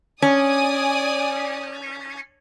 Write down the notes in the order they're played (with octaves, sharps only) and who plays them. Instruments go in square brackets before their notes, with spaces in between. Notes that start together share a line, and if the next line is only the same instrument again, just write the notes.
[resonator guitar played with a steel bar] C#4 [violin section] D5 G#5 D#6